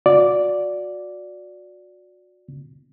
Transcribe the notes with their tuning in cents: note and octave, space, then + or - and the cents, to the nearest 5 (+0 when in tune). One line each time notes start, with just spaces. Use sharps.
F#4 -30 D5 -5